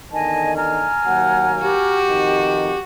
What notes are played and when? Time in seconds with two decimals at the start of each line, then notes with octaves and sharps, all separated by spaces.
0.12 E2 D3 D#3 D#5 G#5 A5
0.56 G#5 A#5 F6
1.06 D#2 F#3 A#3 F#5
1.62 F#4 G4
2.09 F2 D#3